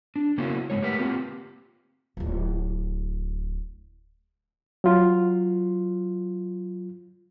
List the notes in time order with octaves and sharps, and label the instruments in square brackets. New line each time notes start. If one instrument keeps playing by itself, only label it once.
[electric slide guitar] D4
C#3 A#3 B3 C#4 E4 F#4
G#2 D#3 G#3 C#5
A3 G4 A#4 B4 E5 F#5
A#3 C4 F4 G4
[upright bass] D1 G1
[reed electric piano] F#3 F4